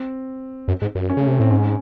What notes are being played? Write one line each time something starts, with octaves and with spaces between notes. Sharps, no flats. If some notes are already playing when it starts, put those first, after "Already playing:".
Already playing: C4
F#2
G#2
F#2
C#4
C#3 A3
C3 C4
A2 C4
G#2 C#4